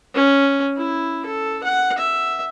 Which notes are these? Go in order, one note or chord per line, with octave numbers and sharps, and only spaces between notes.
C#4
E4
A4
F#5
E5